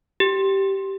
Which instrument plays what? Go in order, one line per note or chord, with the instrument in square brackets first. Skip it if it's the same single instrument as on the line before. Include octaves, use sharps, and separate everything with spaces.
[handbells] G4